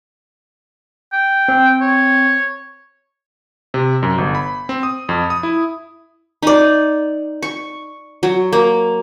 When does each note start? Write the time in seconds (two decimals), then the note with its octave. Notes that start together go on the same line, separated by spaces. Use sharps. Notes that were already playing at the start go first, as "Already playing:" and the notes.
1.13 G5
1.48 C4
1.81 C#5
3.74 C3
4.03 F#2
4.18 G1
4.35 B5
4.69 C4
4.83 D#6
5.09 F2
5.30 D#6
5.43 E4
6.42 D#4 D5
7.42 C#6
8.23 F#3
8.53 A#3